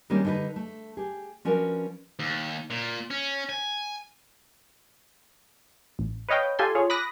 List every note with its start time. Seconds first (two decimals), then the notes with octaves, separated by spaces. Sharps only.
0.10 D#3 G3 G#3 A#3 C4 C#4
0.25 D3 G3 D#4 A4 B4
0.56 A3
0.97 G4 G#4
1.45 F3 C#4 D4 F#4 A#4 B4
2.19 D#2
2.70 A#2
3.11 C#4
3.49 G#5
5.99 A1
6.29 B4 C#5 D#5 F5 G5
6.59 F4 G4 A4 G#5 C6
6.75 F4 G#4 C#5
6.90 B5 D6 D#6 F#6 A#6